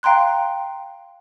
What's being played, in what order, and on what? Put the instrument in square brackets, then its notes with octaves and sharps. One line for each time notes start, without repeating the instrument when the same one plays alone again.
[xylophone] F5 G5 A#5 C6 F#6